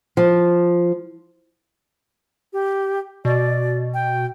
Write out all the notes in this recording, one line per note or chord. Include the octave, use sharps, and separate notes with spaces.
F3
G4
B2 D5
G5